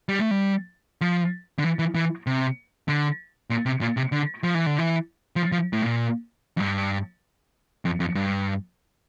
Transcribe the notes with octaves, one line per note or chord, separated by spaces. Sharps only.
G3
A3
G3
F3
D3
E3
E3
E3
C3
D3
A#2
C3
A#2
C3
D3
F3
E3
D3
E3
F3
F3
A2
A#2
F2
G2
F2
F2
G2